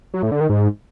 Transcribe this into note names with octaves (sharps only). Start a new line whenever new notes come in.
F#3
A2
D3
D#3
G#2